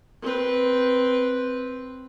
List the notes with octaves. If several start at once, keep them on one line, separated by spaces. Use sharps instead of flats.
C4 B4